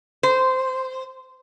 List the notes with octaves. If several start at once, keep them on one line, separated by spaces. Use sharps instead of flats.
C5